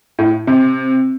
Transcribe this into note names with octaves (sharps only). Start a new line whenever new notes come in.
A2
C3